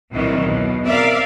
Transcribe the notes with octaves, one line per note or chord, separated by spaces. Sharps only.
C2 A#2 D#3 E3 F#3
E2 B2
C4 A#4 D5 E5 F5